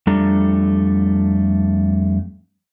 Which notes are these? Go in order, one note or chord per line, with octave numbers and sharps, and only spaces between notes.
F2 G3 A3 D4 A4 A#5